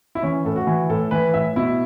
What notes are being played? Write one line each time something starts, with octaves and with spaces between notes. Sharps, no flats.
E4
E3 C#4
A2 A4
F#4
E3
A2 A4
E3 B4
A2 E5
B2 E4